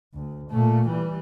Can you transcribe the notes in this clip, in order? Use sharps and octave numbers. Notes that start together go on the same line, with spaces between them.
D2
A#2 A3
E3 G3